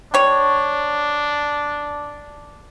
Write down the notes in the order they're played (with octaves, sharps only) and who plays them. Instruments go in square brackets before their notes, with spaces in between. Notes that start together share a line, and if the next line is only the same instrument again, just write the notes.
[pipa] G3 C#5 [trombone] D4